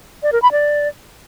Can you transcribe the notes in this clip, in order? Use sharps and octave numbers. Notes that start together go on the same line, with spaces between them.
D5
A#4
B5
D5